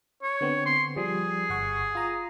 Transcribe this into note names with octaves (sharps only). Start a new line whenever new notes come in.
C#5
D3 B3 C4
C6
F3 G3 G#4
G1 F#5 C#6
F4 A#5 D#6